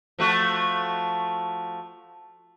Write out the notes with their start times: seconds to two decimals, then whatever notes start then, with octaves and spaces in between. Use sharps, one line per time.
0.19 F3 A3 F#4